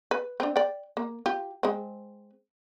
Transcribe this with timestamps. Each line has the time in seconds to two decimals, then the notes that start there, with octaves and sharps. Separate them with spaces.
0.11 B4
0.40 C4 D4
0.56 D5 G5
0.97 A#3
1.26 F4 G4
1.63 G#3 C4